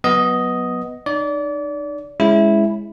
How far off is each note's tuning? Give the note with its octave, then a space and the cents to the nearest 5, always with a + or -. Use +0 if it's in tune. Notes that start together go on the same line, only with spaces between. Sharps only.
F#3 +0 B3 +0 D#5 +5
D#4 -35 D5 -30
G#3 +0 C#4 +5 E4 +0